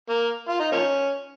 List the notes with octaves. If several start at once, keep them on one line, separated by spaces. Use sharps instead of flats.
A#3
F4
D#4
F3 A#3 C#4